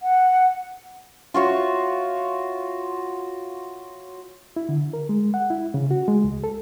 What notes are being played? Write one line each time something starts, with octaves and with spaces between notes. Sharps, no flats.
F#5
F4 F#4 C#5 E5
E4
D3
A#4
G#3
F#5
E4
C#3
F#4
G#3
C#2
A4